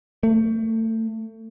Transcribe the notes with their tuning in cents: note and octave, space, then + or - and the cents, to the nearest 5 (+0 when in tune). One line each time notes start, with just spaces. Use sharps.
A3 +30